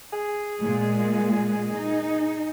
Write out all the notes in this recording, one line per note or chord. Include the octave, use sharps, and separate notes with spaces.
G#4
A#2 G#3
D#4